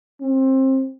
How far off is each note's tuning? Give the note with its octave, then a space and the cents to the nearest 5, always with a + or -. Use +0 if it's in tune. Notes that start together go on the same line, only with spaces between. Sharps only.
C4 +25